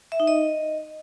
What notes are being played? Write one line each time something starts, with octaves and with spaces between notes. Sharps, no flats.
E5
D#4
D#5